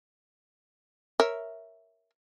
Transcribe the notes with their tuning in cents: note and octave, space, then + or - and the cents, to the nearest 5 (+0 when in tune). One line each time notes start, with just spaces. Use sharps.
A#4 +0 C#5 +0 E5 +0